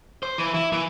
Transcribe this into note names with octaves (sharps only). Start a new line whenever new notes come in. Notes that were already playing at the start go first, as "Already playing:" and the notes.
C5
E3
E4
E3